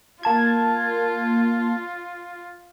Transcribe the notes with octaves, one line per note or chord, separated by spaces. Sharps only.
A#3 F4 A5 G#6